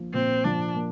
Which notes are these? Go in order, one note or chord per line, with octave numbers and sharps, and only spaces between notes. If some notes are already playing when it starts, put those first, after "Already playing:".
Already playing: F3 A#3
A#2 C4
F3 D4
A#3